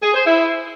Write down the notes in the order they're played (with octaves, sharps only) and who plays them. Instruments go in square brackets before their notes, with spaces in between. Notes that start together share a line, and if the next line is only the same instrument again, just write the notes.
[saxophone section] G#4
C5
E4